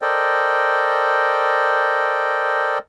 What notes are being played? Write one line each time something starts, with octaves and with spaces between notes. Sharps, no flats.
A4 A#4 C5 D5 D#5 G5